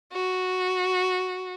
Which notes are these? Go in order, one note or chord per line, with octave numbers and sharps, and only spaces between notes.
F#4